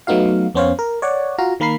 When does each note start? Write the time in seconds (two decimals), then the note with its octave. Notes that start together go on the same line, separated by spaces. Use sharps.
0.07 F#3 A3 B3 D#4 F#4 F5
0.55 F2 B3 C#4 C5 C#5 F5
0.79 A#4
1.02 C#5 D5 F#5
1.38 F4 F#4 F5 A#5
1.60 D#3 A#3 A#4 B5 C7